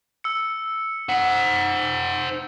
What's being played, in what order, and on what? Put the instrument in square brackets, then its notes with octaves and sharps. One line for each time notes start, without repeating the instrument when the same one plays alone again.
[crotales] E6 C#7
[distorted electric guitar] C5 F#5